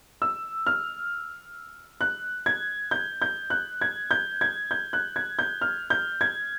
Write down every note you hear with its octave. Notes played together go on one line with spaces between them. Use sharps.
E6
F6
F#6
G#6
G6
G6
F#6
G#6
G6
G#6
G6
F#6
G#6
G6
F6
G6
G#6